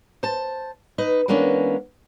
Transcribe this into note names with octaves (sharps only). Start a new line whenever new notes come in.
C5 A5
D#4 B4 D#5
E3 G#3 A#3 B3 C#4 D4